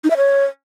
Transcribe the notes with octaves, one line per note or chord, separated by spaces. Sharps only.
D#4
E5
C#5